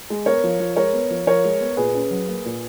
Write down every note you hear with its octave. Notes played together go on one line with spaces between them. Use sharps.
G#3
B3 A#4 C#5
F3
F3
G#3 A#4 C#5
B3
F3
F3 A#4 C#5
G#3
B3
A#2 G#4 B4
C#4
F#3
A#3
A#2